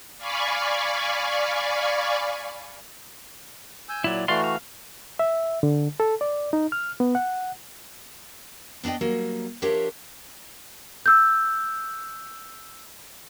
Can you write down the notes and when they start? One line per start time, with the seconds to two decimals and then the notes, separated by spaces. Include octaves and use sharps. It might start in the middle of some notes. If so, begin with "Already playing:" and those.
0.18 D5 F5 G#5 B5 C#6
3.89 G#5 E6 G6
4.04 A#2 F#3 E4 D5
4.28 E3 A3 F#4 D5 F5 C6
4.44 F5
5.19 E5
5.63 D3
6.00 A4
6.21 D5
6.53 D#4
6.72 F6
7.00 B3
7.15 F#5
8.84 B3 D4 D5 D#5 G5
9.01 F#3 G3 A#3
9.62 F3 D4 G4 A#4 C#5 E5
11.06 E6 G6